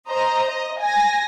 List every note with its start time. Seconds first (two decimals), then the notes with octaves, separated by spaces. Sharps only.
0.10 C5 D#5 A#5
0.48 D#5
0.82 G#5 A#6